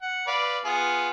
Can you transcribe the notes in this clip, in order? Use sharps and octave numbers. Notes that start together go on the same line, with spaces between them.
F#5
B4 D5 F5
B3 F4 G#4